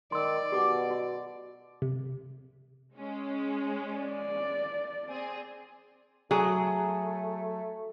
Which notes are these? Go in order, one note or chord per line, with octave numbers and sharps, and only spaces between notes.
D#3 D5 C6 E6
B2 G4 D6
F#4
C3
G#3 C#4
D5
C4 G#4
F#3 A3 G#4